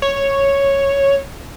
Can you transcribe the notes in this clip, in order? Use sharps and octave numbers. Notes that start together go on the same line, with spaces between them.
C#5